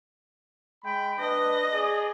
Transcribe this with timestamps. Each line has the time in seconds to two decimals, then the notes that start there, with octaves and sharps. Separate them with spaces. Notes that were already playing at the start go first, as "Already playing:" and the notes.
0.84 G#3 G5 B5
1.19 D4 B4 D#5
1.73 G#4 D5